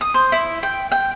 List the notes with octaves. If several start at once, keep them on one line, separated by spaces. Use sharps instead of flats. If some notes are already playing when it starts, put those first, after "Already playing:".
D#6
C5
E4
G5
G5